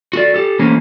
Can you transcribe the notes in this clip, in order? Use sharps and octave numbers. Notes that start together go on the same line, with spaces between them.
F#4 A4 D5
G4 A4
E3 A3 A#3 C4 C#4